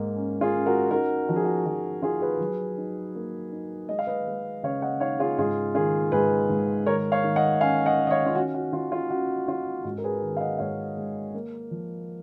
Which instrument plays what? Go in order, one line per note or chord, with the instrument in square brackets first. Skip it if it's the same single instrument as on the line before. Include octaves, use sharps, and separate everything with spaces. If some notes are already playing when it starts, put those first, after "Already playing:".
Already playing: [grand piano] G#2 A#3
C#4
F4 G#4
C#4
F#4 A#4
D#4 F#4 A#4
F3 F#4
G#4
F#4
F3 F#4
D#4 F4 G#4
G#4 B4
F#3
D#4
A#3
D#4
G#3 D#5
F5
B4 D#5
G#3
C#3 C#5 F5
D#5 F#5
D#4 C#5 F5
F4 G#4
G#2 F4 G#4
D#3 F4 G#4
G#2 G#4 B4
G#2
D#3 A#4 C#5
C#5 F5
D#3
D#5 F#5
C#4 F5 G#5
D#5 F#5
D#3
D#5
C#5 F5
F4
C#4 F#4
F#4
C#4 F4
F4
C#4 F#4
C#4 F4
G#2 F#4
A#4
G#4 B4
D#3
F5
D#5 F#5
G#2 C#5 F5
G#3
A#3
F3